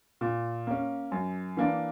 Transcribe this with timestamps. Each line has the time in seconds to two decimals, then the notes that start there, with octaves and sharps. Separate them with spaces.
0.21 A#2
0.67 A#3 C#4
1.12 F#2
1.57 E3 A#3 D4